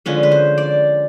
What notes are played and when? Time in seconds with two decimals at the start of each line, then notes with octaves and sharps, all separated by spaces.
0.06 D3 F3 G#3 C#4 B4
0.23 B4
0.32 C5
0.58 D5